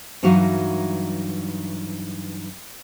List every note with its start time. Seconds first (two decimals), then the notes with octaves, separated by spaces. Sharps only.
0.23 G2 E3 F#3 D#4 F#4 F5